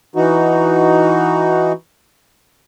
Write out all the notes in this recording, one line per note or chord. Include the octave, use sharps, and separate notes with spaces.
E3 D#4 F#4